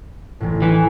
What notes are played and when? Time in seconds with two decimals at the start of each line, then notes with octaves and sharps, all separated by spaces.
0.40 A1 A2
0.62 E3 G#5